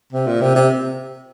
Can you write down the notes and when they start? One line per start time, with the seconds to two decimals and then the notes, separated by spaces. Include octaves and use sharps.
0.12 C3
0.26 A#2
0.41 C3
0.55 C3